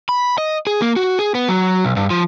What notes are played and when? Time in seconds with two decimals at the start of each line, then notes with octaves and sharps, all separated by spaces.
0.09 B5
0.38 D#5
0.67 G#4
0.82 A#3
0.96 F#4
1.19 G#4
1.35 B3
1.49 F#3
1.85 B1
1.97 G2
2.10 F3